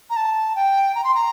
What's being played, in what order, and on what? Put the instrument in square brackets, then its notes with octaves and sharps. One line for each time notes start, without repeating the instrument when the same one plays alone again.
[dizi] A#5
A5
G5
A#5
C6
A#5